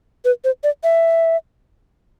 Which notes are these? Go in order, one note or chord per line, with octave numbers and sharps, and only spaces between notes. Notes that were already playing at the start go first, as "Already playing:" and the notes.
B4
C5
D5
E5